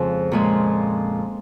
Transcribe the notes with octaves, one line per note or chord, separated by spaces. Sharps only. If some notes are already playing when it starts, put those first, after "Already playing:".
Already playing: F2 C#3 F3 G#3 F4
A#2 F3 G#3